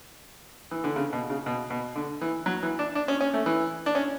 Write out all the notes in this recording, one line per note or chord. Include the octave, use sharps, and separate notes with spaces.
E3
D3
C#3
B2
C#3
B2
B2
D3
E3
F#3
E3
D4
D4
C#4
C#4
A3
E3
D4
C#4